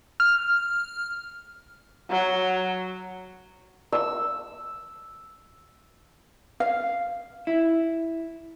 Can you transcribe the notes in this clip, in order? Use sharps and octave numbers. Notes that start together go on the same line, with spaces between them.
F6
F#3
E6
F5
E4